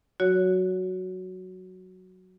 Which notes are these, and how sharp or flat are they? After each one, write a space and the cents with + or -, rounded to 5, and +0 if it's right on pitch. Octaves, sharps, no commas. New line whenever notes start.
F#3 +0 F#4 +0 C#5 +15